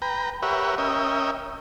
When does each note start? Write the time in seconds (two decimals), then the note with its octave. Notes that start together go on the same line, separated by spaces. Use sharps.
0.02 B4 G5 A#5
0.42 G4 A#4 B4 C#5 E5 F#5
0.78 C#4 A#4 D#5 E5 G5